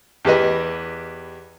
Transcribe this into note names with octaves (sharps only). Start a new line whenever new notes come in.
E2 G4 B4 D#5